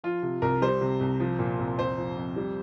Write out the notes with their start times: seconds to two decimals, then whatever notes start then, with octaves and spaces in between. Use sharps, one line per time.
0.04 F3 F4
0.23 C3
0.42 C2 A#4
0.62 G3 C5
0.81 C3
1.00 C2
1.20 F3
1.39 A#2
1.59 C2
1.78 F2 C5
1.98 F3
2.17 F2
2.36 G3